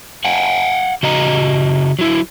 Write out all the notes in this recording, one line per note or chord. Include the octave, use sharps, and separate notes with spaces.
F5 F#5 G#5
C#3 F#4 D#5 A#5
F#3 E4